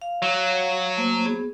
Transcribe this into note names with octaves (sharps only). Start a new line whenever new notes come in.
F5
F#3
A3 A#3 C5
B3 G#4